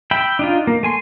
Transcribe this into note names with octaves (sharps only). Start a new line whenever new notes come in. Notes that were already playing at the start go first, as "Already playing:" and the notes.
E5 G5 B5
D4 D#4 F4
A#3
A3 G#5 C6